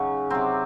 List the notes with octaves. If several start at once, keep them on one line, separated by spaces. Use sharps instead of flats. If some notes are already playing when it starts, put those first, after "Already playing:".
Already playing: C#3 F#3 C#4 D#4
C3 F#3 C4